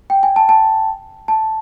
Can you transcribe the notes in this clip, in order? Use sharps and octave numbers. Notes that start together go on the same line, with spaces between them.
G5
G#5
A5
A5
A5